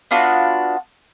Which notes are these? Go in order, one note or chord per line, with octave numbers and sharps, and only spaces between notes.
B3 D4 F4 F#4